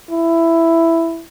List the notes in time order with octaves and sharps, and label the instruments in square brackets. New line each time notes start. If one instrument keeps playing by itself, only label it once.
[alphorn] E4